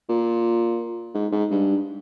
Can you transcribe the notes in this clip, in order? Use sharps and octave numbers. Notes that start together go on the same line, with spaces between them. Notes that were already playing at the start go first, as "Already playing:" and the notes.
A#2
G#2
G#2
G2